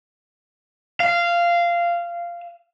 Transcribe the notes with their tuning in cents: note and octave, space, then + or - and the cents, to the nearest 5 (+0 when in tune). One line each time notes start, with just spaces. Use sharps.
F5 -15